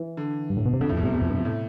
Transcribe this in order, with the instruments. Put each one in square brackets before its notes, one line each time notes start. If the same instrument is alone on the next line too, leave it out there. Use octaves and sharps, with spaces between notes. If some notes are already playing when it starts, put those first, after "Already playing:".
Already playing: [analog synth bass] E3
[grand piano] D3
[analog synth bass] G2
A2
B2
C3
[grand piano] F2 [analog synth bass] D3
[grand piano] A2
[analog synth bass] F2 [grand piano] B2
[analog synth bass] G2 [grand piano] C3
[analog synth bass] E2
F2
G2
F2
[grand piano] A2